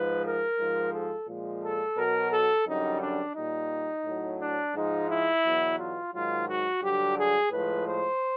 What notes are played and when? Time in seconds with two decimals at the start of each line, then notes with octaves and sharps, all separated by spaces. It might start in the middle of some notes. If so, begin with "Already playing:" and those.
Already playing: G#2 F3 G#3 B4
0.24 A#4
0.58 G#2 F3 G#3
0.93 A4
1.28 A#2 F3 G#3
1.63 A4
1.97 B2 F#3 A#4
2.31 A4
2.67 F#2 D3 G3 D#4
3.01 D4
3.35 A#2 G3 D#4
4.05 A2 F#3
4.39 D4
4.75 G#2 F3 G#3 D#4
5.09 E4
5.44 E2 B2 F#3
5.79 F4
6.14 G#2 D#3 F#3 F4
6.48 F#4
6.82 G2 D3 F#3 G4
7.17 G#4
7.52 A2 F3 G#3 B4
7.87 C5